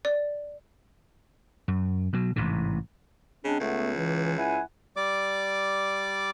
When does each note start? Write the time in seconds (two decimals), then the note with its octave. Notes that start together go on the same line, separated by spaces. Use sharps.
0.05 D5
1.68 F#2
2.13 B2 F#3
2.36 A1 G#2 C3 E3
3.44 C#3 G#3 C4 D4
3.60 C#2 A3 B3
3.96 E3
4.36 E4 F#5 G#5
4.96 G3 D5 D6